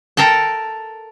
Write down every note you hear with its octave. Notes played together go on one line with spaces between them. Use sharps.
A4 A#4 G5 A5